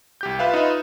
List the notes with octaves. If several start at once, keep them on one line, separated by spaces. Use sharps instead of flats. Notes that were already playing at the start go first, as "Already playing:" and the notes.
C2 G4 G6
F4 B4 E5 F5
D#4 F4 B4 E5